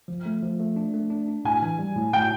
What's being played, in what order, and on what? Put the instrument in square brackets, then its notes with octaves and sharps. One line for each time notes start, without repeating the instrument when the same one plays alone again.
[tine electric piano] F3
A3
F3
A3
D4
A3
D4
D4
[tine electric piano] A2 [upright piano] G#5
[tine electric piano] E3
G3
A2
[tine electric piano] A2 [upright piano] G5